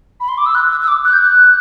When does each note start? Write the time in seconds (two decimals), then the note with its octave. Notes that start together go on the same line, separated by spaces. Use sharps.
0.20 B5
0.29 C6
0.38 D6
0.46 E6
0.55 F#6
0.71 E6
0.81 E6
0.88 D6
1.05 F#6
1.13 G6
1.21 F#6